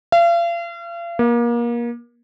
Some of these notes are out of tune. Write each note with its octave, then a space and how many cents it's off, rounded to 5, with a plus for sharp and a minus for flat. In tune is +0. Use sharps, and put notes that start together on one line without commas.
F5 -40
A#3 +30